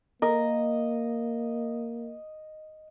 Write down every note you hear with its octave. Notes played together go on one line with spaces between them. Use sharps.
A#3 A#4 D#5